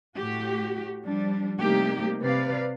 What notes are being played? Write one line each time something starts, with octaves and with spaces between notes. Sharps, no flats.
A2 F#4 G4
F3 G3 D4
C3 G3 A3 A#3 D#4 G4
C3 B4 D5 F5